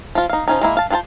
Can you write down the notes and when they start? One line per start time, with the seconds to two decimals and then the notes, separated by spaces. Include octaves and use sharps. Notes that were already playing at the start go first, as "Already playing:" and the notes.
0.15 F3 F4
0.29 D#4 F5
0.48 F3 C#4 D#4
0.61 G#3 A#3 E4
0.77 F5 A5
0.90 D4 F4 G#4 C5 A5